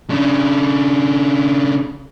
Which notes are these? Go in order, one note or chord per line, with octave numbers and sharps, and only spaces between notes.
C#3 D4